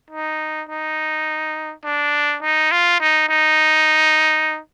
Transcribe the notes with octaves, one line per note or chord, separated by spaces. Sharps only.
D#4
D#4
D4
D#4
F4
D#4
D#4